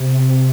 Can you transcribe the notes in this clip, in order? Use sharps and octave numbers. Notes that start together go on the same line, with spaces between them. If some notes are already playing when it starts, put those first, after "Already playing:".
Already playing: C3